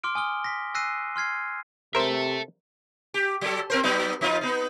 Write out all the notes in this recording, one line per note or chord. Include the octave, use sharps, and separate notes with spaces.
C6 D6 F6 D7
G#5 D#6 F6 G7
A#6 B6
G#5 E6 F#6 A#6 C7 D#7
C6 F6 G#6 C7
C3 A4 A#4 C5 E5
G4
F#3 A4
C4 A#4 C5
F#3 B3 D#4
F3 D#4 F4
B3 D#4